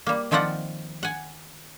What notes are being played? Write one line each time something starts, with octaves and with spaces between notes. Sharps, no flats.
G3 A#3
D#3 F3 C4 F4 D5 F#5
F#5 G#5